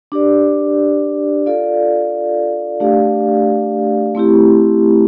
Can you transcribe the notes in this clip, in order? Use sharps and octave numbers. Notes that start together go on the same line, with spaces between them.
D4 G4 D5
F4 A4 D5 F5
A3 D4 G4 D5 F5
A3 C4 E4 G4